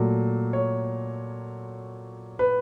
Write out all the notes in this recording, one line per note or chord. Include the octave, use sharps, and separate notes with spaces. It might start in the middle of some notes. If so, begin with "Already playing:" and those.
Already playing: A#2 F#3 A3
C#5
B4